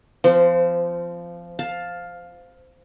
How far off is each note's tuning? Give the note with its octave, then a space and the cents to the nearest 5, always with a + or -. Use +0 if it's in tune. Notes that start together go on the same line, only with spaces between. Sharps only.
F3 -15 C4 -30
F5 +10 A5 +0